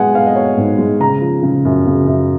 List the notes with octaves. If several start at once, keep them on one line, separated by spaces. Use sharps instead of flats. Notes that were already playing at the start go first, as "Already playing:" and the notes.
Already playing: G#3 B3 F#5 G#5
B3 F5
D#5
B3 C#5
G#2
G#3
C#3 A#5
F3
C#3
F#2
C#3
F#2